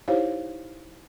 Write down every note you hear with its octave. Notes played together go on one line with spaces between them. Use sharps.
D#4 E4 G4 C5 C#5 F5